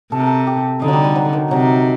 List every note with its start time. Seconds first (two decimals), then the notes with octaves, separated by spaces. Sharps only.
0.12 C3 A4
0.20 A#4
0.27 A4
0.47 G4
0.81 D3 D#4
0.88 F#3
0.93 G3
1.04 G3
1.15 F#3
1.33 D#3
1.50 C3 F#3